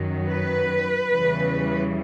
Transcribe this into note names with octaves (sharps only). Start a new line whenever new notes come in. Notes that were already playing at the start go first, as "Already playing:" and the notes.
Already playing: F#2 D#3 F#3
B4
E2 C#3 E3 G3